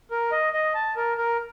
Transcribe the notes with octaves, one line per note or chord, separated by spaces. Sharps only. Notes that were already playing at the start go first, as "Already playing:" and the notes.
A#4
D#5
D#5
A5
A#4
A#4